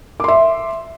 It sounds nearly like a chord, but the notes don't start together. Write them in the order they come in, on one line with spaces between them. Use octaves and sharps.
D6 C6 E5